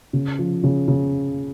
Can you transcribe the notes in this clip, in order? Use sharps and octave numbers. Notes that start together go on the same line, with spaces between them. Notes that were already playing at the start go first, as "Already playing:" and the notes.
C#3
F3
C#3
C#3